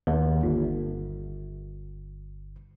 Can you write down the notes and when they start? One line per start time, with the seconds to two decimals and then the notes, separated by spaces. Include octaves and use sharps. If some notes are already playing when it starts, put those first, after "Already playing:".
0.07 D#2
0.43 G1